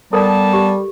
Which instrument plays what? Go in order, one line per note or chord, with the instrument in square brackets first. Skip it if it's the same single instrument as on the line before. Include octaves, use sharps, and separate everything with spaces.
[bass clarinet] G3 [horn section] B3 A5 [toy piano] A4 A#4 D5
[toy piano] G4